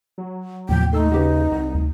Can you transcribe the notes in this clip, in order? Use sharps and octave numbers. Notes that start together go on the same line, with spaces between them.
F#3
D#2 A2 C3 F3 G5
A3 D#4 C6 E6
C#3 F#4 G4 B4
C2 F#4
D2